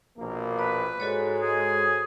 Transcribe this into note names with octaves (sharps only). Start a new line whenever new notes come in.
A#1 B2 A#3
B4 D5
G#2 G#3 F#4 A4 C#5
G#4